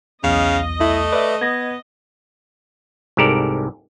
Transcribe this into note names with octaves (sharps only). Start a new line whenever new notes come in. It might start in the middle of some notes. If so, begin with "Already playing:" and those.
B1 E2 C#3 D#5 F5
A3 E4
B4 D5 E5
B3 G#6 A#6
C2 G#2 G4 A4 A#4 D5